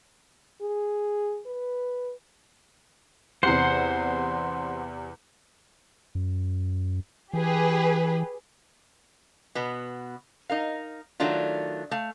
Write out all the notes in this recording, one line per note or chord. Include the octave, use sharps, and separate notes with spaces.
G#4
B4
E2 C3 C5 F#5 C7
F#2
E3 G4 G#4 B4
B2 B3
D#4 A#4 F5
D#3 F#3 A3 D4 F4
A3 F5